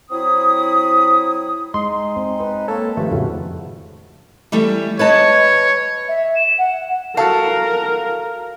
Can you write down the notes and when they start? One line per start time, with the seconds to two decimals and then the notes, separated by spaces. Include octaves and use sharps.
0.11 F#3 C4 E4 D#6
1.74 G#3 D#4 C6
2.16 C4
2.40 B4
2.68 A#3 A4 C#5
2.97 G2 D#3 F3 A3
3.11 F2 A2 C#3 F#4
4.52 E3 G3 A3
4.99 B4 C#5 D#5 A5
6.08 E5
6.36 E7
6.58 F#5
7.17 F#4 A4 A#4 F5 A5